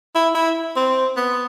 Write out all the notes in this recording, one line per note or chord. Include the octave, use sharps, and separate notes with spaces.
E4
E4
C4
B3